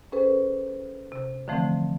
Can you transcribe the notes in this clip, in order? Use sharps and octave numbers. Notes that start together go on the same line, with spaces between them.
C#4 G#4 A4 B4 C5
C3
D3 E3 F3 A3 C4